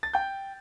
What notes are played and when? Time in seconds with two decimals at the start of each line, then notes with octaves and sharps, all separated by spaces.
0.03 A6
0.13 G5 G6